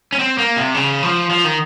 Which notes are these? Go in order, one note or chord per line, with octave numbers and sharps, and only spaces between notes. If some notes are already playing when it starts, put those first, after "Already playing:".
C#4
C4
A#3
C3
C#3
F3
F3
D#3